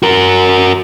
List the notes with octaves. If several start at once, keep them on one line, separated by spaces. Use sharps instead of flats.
F#4 A#4